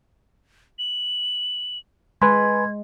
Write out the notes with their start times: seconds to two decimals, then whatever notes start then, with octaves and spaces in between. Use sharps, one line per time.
0.79 F#7
2.22 G#3 B4 G#5 B5 C6 G#6